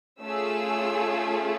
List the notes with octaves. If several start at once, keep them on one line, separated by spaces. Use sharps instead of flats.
A3 C#4 F4 G#4 E6